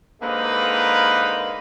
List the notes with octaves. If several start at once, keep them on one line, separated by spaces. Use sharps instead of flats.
D3 G#3 A#3 C4 D#4 B4